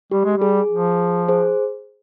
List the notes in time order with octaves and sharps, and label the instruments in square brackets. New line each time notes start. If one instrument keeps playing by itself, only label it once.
[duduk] G3 [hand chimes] G4
[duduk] G#3
[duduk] G3 [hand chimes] G#4
[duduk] F3
[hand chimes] G#4 C5